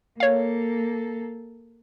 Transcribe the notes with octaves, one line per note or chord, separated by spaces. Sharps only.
A#3 A4 C#5 F5